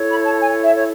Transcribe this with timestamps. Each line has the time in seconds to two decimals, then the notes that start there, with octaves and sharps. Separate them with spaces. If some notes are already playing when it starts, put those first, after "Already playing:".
Already playing: E4 A4 C#5
0.11 B5
0.25 A5
0.41 G#5
0.63 E5
0.75 C#5